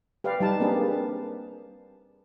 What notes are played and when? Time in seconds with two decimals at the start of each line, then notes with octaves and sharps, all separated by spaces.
0.24 G4 B4 D5 F5
0.40 G3 D#4 A5
0.60 A#3 C4 D4 G4 G#4 B4